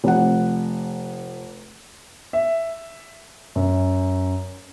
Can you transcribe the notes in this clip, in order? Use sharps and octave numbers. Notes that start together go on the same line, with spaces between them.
F1 F#5
E5
F#2